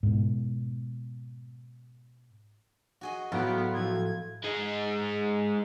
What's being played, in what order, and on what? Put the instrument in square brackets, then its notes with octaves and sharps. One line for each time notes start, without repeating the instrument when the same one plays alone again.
[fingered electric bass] G#2 B2
[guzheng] F#4 G#4 D#5
[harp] A2 A#5 D7 [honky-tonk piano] F#3 F#4 [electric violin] B3 [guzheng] F4
[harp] A2 F3 A3 [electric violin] G#6
[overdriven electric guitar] G#3 D#4